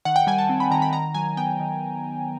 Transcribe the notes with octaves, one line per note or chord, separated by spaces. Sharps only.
D#3 F#5
G5
G3 G#5
A5
C4
B5
D#3 A#5
B5
D#3 A#5
F#3 G#5
B3 G5
D#3